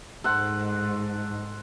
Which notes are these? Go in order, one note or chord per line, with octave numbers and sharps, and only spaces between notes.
G#2 A4 C5 F#5